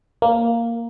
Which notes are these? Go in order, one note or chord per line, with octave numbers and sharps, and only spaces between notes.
A#3